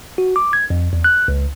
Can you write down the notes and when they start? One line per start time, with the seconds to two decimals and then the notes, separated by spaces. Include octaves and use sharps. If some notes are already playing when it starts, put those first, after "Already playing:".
0.18 F#4
0.36 D6
0.53 G#6
0.70 F2
0.93 E2
1.04 F#6
1.28 C#2